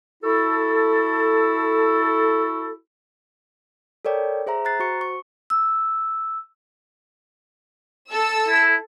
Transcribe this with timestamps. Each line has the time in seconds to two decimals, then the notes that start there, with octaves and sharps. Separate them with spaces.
0.23 E4 F#4 A4
4.05 A4 A#4 C#5 D5 G5
4.46 G#4 C5 E5 A#5
4.65 A#5 F#6 A6 C7
4.80 F#4 C5 C#6 C#7
5.01 C#6
5.50 E6
8.11 A4 E6
8.48 E4